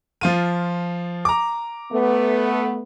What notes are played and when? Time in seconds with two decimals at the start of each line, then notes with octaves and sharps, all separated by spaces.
0.21 F3 F4 D#7
1.25 A#5 D6
1.91 A3 B3